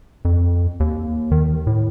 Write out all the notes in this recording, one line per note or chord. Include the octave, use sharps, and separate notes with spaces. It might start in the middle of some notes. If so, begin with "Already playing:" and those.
F2
D#2
D#3
A2